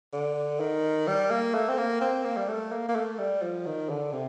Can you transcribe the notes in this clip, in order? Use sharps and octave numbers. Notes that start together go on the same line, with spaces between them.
D3
D#3
G3
A#3
A3
C4
A#3
C4
A#3
G3
A3
A#3
A#3
A3
G3
F3
D#3
D3
C3